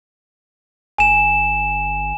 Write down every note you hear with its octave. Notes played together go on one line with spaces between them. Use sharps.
G1 G#5 E7